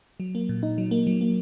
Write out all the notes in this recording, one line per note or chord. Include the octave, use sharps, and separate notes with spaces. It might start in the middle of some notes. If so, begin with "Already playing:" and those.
F#3
A#3
A#2
D#4
F#3
A#3
F#3
A#3